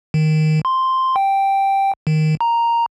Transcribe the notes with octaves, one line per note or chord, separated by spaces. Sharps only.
D#3
C6
G5
D#3
A#5